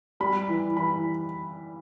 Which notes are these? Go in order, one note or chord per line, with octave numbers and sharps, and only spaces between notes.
G3 B5
E3
E3 B5